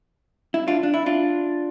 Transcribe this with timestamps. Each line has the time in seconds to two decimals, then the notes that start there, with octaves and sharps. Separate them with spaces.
0.54 E4
0.67 D4 F4
0.83 D4
0.94 E4
1.06 D4 F4